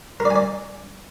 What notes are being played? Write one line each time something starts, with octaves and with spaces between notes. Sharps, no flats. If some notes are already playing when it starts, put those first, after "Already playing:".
A#4
D5
G#5
D5